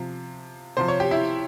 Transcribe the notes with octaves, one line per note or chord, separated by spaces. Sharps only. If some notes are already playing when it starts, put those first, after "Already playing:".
Already playing: C3 F3
C3 F3 C5
C#5
G4
E4